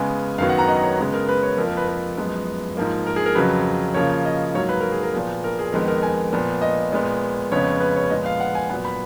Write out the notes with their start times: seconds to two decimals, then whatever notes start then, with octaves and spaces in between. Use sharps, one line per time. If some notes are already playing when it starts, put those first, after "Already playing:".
Already playing: C#3 G#3 B3 G#5
0.38 F#2 D#3 F#3 B3 F5
0.49 F#5
0.59 A#5
0.68 D#5
0.83 C#5
0.98 C#3 G#3 B3
1.14 A#4
1.28 B4
1.43 C#5
1.57 F2 F3 A#3 A#4
1.68 A#4
1.77 B4
1.88 B4
2.17 F#2 F3 G#3 B3
2.77 G#2 F3 A#3
3.06 A#4
3.16 G#4
3.26 A#4
3.35 F2 C#3 F#3 B4
3.94 C#3 F3 A#3 C#5
4.25 D#5
4.54 G#2 F#3 A#3 C#5
4.69 B4
4.81 A#4
4.92 G#4
5.03 A#4
5.14 A#2 F3 B3
5.44 A#4
5.59 G#4
5.73 F2 D#3 G#3 B3 A#4
5.88 A#4
6.03 G#5
6.33 A#2 F3 B3
6.62 D#5
6.92 A#2 G#3 B3
7.52 F2 C#3 G#3 B3 C#5
7.80 B4
7.96 C#5
8.10 A#2 F3 G#3 B3 D#5
8.26 F5
8.40 F#5
8.55 G#5
8.69 A#2 F#3 B3 F#5
8.85 B5